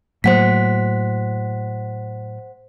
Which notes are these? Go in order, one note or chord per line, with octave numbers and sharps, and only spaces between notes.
A2 F#3 A#3 C5 F#5 B6